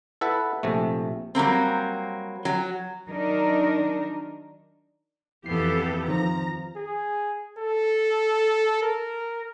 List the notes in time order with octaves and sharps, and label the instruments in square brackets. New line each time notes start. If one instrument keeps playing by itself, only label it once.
[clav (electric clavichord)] E4 A4 B4 F#5
A#1 C3 A3
[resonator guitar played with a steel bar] F#3 G3 A#3 C4
F#3
[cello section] D#3 F#3 D4 D#4 A#4
[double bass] F2 E3 [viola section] B3 G4 A4 [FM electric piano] C7
[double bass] F2 F3 [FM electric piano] D#3 C5 [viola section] A#5
[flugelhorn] G#4
A4
A#4